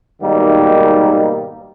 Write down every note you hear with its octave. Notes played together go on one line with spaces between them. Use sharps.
G#2 B2 D#3 G3 A#3 D#4